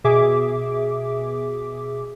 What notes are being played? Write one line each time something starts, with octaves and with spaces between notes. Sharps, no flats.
B2 G#4 E5 D6